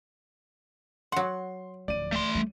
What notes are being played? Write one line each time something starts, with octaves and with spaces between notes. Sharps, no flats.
F#3 F#5 C6
D1 F3 D5 D#7
A3 C6
G3